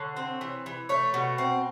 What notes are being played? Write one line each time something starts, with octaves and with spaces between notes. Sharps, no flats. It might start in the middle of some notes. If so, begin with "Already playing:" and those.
Already playing: D3 C#5
C4
E3
E3
A3 C#5
B2
C4